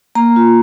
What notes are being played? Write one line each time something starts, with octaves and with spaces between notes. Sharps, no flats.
A#3 A#5
F4